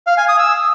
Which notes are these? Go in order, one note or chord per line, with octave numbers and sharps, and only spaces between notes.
F5
G#5
D#6
E6